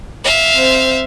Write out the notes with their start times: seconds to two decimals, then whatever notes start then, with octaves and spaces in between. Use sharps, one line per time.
0.24 E5 F5
0.53 C4 C5